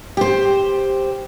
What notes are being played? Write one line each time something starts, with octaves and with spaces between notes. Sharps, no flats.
G4 C5